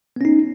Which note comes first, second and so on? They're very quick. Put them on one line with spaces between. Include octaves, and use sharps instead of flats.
B3 C#4 D#4